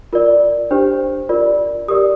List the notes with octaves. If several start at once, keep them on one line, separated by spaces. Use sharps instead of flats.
F4 A#4 D5
D4 G4 C5
F4 A#4 D5
G4 A#4 D5 D#6